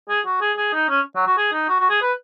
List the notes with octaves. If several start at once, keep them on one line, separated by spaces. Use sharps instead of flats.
G#4
F#4
G#4
G#4
D#4
C#4
F#3
F#4
G#4
D#4
F#4
F#4
G#4
B4